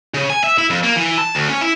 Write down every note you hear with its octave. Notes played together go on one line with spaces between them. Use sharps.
C#3
G#5
E5
E4
F2
A#3
E3
A5
D2
C#4
E4